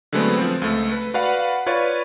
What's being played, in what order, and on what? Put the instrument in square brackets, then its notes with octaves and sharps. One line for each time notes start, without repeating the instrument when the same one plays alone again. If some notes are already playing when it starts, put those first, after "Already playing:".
[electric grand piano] D3 F#3 G#3 A3 B3 C4
F3 C4
C#2 A3
B4
F#4 B4 D5 F5 F#5
F4 B4 C#5 D5